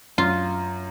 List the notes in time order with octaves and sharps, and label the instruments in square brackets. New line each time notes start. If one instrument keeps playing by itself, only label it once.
[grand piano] F#2 [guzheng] F4